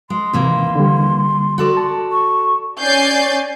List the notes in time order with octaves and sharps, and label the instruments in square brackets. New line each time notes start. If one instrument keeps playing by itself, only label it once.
[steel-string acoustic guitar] G#3 [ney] C6
[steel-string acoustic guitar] D#2 E3 A#3 [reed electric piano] C3
[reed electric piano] D3 G3
[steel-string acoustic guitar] F#4 A4 D5
[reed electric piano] A5
[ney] C#6
[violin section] C#4 D5 G#5 G6 A6 C7